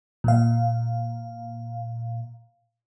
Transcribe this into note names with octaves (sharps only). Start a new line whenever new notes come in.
A#2 F5